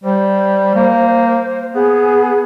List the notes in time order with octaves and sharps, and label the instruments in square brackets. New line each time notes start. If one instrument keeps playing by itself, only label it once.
[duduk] G3 [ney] C5
[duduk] A#3
[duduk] B3 [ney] G#4